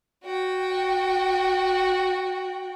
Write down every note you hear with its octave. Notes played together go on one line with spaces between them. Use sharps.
F#4 G5